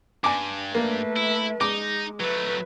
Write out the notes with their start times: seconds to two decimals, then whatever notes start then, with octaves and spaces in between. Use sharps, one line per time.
0.24 G2 G#5 D6
0.75 A3 A#3 B4
1.17 E4
1.61 G#3 D#4 D6
2.20 F#3 A3 B4